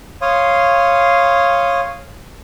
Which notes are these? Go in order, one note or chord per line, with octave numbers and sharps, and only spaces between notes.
C#5 F5 C6 D#6